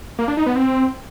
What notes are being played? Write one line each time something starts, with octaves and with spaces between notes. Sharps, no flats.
A#3
D4
D#4
B3
C4